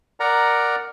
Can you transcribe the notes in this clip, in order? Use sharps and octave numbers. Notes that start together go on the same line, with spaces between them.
A#4 D5 F#5 A#5